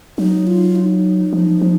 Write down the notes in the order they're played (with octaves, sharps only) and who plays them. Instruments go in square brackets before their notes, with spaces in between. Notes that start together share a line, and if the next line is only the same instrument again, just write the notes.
[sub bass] F#3 [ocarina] D#4
[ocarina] F4
D#4
[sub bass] F3
F3